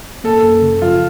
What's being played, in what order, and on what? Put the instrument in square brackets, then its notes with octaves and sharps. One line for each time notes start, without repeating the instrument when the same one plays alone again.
[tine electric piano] A#3 [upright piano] A4
[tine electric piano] F#2
C#3
[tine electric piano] F3 [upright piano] F4